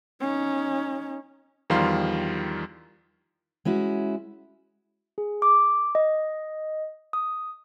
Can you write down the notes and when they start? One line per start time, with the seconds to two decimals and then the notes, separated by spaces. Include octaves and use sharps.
0.21 C#4 D#4
1.70 E2 D#3 F3 G3 F5 C6
3.65 G#3 C#4 E4 F#4
5.18 G#4
5.42 D6
5.95 D#5
7.13 D#6